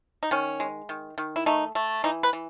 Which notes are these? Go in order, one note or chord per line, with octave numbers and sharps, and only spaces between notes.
D#4
D#3 C#4
G#3
D#3
D#3
E4
A3 D#4
A3
E3 D#4
B4
E3